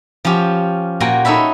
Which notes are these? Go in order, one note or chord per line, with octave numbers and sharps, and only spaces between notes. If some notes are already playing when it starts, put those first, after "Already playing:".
F3 C#4 F4 G4
A#2 A#3 F#4 G5 G#5
D#4 A4 C#5 E5 B5